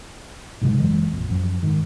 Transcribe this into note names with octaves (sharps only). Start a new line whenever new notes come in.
B1 G#2 C#3 G#3
F#1 E3 G#3
A#1 F2
F#2 F3
G#2 D#3